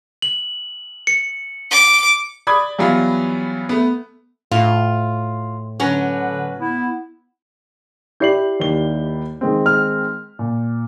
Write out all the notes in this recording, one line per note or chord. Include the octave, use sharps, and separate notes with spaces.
F#7
C#7
D6
D5 B5 D6 D#6 G#6
E3 F#3 G3 B3 F4
A3 B3
A2 F4
D3 F#3 C#4 B4
B3 E4
E4 G4 D5 G6 C7 F#7
D#2 D#3 G7
D#3 G#3 C4
F6
A#2